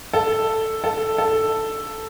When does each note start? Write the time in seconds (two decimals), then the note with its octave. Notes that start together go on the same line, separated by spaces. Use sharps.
0.13 A4
0.84 A4
1.18 A4